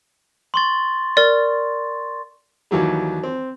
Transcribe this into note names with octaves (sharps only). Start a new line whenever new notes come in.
C6 C#6 A6
A#4 D5
D#2 E3 F#3 G3
C4